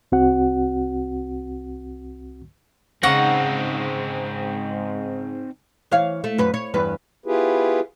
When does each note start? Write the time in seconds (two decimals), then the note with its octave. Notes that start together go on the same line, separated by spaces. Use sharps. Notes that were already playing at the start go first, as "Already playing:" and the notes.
0.12 C2 C4 F#4 F#5
3.03 G#2 C#3 C4 D#4 F#5 C#6 A#6
5.91 E3 C#5 F5
6.24 A3
6.38 F#2 B4
6.54 C#5
6.74 E2 G2 B4
7.26 B3 E4 F4 G4 G#4 B4